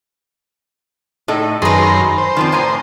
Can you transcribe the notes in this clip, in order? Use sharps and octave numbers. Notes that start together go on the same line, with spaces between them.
A2 D#4 A4
F#2 D#3 G#4 B4 A#5 C6
C5
D#3 F3 C4
A2 G#5 A#5